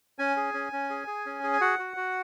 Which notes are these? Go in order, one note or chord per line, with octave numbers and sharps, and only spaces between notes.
C#4 G#5
G#4
C#4
C#4
G#4
G#4
C#4
G#4
G#5
F#4 F#5
F#4
F#4